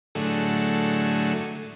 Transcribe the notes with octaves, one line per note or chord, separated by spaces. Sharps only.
A2 D3 F#3 G#3 A3